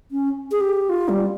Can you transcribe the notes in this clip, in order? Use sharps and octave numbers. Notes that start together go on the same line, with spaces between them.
C#4
G#4
G4
F4
G3